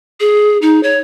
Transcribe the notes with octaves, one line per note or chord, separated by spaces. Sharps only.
G#4
D#4
C#5